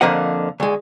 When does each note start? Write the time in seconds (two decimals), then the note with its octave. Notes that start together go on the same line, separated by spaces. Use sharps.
0.01 F2 D3 F3 A#3 D#5 F#5
0.60 D2 G#3